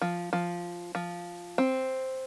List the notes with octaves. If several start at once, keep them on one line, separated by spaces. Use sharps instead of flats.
F3
F3
F3
C4